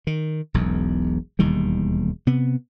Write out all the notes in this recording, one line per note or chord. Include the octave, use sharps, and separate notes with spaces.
D#3
E1 B1 E2
E1 D#2 D#3 G3
C3 B3